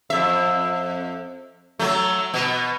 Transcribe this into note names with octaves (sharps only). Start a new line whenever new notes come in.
F2 E5
F#3 A3
B2 B3